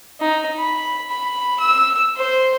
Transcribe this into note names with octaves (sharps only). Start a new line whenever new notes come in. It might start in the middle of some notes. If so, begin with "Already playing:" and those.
D#4
B5
B5
E6
C5